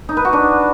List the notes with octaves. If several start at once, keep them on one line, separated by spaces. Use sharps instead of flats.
D#4
B4
F#4
D4